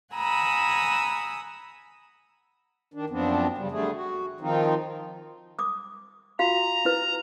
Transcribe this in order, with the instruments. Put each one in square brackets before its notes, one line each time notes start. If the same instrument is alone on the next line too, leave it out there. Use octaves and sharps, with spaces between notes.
[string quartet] F#5 G#5 A#5 B5 D#6 E6
[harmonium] D#3 D4
F#2 F3 B3 C4 D4
C#3 G3
D3 G3 A3 G#4
F#4
D#3 F3 C4 D#4 F4
[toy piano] D6 D#6
[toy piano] F4 F#4 F5 [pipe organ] A#5
[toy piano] E4 B4